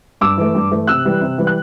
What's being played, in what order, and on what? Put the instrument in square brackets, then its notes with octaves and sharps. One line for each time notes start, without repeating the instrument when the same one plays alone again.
[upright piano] G2 D6 E6
E3 A3
G2
E3 A3
C3 E6 F#6
E3 G3
C3
E3 G3
F#6